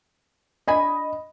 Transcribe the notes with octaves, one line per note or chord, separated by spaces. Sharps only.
D4 D#5 G#5 B5